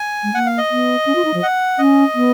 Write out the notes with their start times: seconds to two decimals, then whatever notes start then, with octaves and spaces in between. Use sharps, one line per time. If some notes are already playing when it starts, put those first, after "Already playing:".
Already playing: G#5
0.23 G#3
0.34 A#3 F#5
0.46 F5
0.58 D#5
0.71 B3
1.06 C#4
1.15 F4
1.25 D#4
1.34 F3
1.43 F#5
1.78 C#4 D#5
2.15 B3